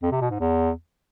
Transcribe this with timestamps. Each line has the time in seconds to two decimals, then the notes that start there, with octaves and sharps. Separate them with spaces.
0.03 F2
0.12 C3
0.21 B2
0.30 G#2
0.40 E2